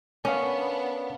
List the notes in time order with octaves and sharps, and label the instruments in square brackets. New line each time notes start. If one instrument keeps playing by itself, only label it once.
[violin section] B3 D4 [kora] C#4 [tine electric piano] A#4 C#5 F5